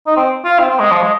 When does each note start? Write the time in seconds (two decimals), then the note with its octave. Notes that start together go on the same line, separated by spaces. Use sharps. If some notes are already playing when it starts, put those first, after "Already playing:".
0.06 D#4
0.16 C4
0.45 F4
0.59 C4
0.70 C4
0.80 G#3
0.91 F3
1.02 G#3